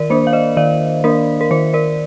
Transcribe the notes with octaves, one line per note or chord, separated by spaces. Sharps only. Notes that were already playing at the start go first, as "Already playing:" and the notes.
Already playing: D#3 A#4 D5
A#3 D4 C5
F5
C5 D#5
D#3 D5 F5
A#3 D4 A#4
A#4
D#3 C5
A#4 D5